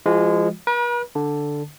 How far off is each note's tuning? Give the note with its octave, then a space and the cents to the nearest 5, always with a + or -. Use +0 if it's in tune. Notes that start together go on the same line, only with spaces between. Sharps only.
F3 -40 G#3 -20 F4 +40
B4 -45 A#5 +40
D3 +0 A5 +0